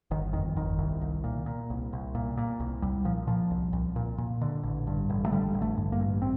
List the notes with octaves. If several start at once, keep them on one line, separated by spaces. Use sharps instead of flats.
G1 D#3
F2 D#3
G1 D#3
C2
C2
A#2
A#2
C2
C2
A#2
A#2
C2
C2 G3
A#2 F3
A#2 F3
C2
C2
A#2
A#2
D3
A1
G2
A1
A3
D3 G3
A1
A3
G2
A#3
A1
C4